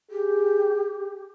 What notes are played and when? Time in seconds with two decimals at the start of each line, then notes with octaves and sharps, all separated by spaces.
0.11 G4 G#4